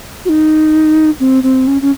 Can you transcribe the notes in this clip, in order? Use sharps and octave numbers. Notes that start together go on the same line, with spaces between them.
F#4
D#4
C4
C4
C#4
C#4